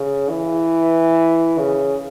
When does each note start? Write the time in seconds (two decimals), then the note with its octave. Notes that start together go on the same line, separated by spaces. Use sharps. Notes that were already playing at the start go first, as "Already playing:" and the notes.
Already playing: C#3
0.29 E3
1.59 C#3